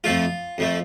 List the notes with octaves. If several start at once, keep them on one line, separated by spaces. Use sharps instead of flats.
F2 F3 A3 F4
F2 F3 A3